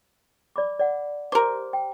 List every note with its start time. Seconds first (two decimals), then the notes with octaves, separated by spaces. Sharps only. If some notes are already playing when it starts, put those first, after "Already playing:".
0.56 D5 B5 D6
0.80 D5 F#5
1.32 G4 A#4 C5 D6
1.73 G5